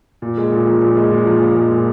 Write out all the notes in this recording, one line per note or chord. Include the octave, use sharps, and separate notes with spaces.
A#2
G#3
A#2
F3
A#2
G#3
A#2
F3
A#2
G#3
A#2